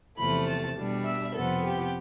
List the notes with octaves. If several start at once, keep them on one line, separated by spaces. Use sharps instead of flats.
E2 C3 F3 A3 B5
A5
B2 G3 D4
E5
F2 C3 F3 B3 A4
G4